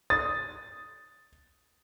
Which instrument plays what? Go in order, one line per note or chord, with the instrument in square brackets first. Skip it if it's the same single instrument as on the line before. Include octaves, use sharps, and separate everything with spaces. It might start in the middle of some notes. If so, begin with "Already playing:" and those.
[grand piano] D#6 A6